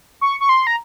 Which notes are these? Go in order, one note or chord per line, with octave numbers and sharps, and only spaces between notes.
C#6
C#6
C6
A#5